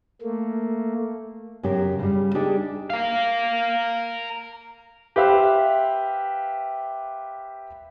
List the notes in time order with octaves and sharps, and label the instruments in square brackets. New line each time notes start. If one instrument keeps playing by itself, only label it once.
[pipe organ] A3 A#3
[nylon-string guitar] F#2 C#3 G4 A#4
C#3 G3
D4 D#4 G4 G#4 D5
[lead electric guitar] A#4 F5
[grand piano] G4 B4 C5 E5 F5